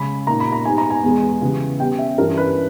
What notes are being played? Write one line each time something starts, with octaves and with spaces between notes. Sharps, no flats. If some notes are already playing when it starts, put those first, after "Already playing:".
Already playing: C#3 G#3 C#4 B5
A#2 A#3 D#4 A#5
B5
A#5
G#2 G3 B3 D#4 G#5
A#5
G#5
E2 B2 G#3
C#3 E3 G3 B3
B2 G3 C#4 G5
E5
G2 E3 G3 C#4 A#4
B4